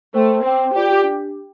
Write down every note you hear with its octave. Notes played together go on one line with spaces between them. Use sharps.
A3 C5 G5 C6
C4 C5 G5 D6
F4 G4 D5 G5
D4